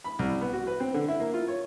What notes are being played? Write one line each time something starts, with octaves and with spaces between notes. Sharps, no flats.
B5
C2
B3
F#4
B4
C4
D3
E4
A#3
F4
C#5